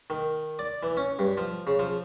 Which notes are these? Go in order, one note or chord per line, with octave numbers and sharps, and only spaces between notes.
D#3
D5
E3
C#4
G2
F3
C#3
F3